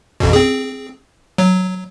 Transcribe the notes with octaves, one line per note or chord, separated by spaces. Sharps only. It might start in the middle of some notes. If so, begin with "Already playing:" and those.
A1 F2 B2
C4 G#4
F#3